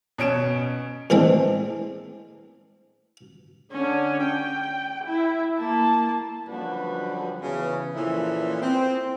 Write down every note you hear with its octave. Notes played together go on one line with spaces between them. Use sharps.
B2 C#4 D7 E7
A2 E3 G#3 C4 D4
D3 C#4
G5
E4
A#3 A5
F#2 D3 F3 G3 F#4 B4
C#3 E3 B3
A#2 E3 F3 C#4 E4 A4
C4